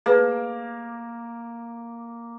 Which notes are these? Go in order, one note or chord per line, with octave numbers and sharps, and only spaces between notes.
A#3 G#4 B4